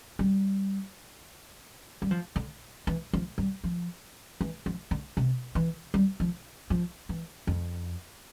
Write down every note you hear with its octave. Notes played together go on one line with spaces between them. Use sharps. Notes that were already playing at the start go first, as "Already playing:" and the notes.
G3
G3
F3
D3
E3
F3
G3
F3
E3
F3
D3
C3
E3
G3
F3
F3
E3
F2